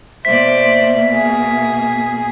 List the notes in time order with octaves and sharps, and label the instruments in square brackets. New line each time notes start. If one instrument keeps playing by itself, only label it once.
[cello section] B2 A#3 [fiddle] C5 D5 [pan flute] E5 [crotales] B6
[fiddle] G#4